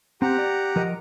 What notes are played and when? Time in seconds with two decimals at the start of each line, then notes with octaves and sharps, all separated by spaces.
0.22 C4 G4 F#5 A#5
0.38 D5
0.76 F3 A#4 D#5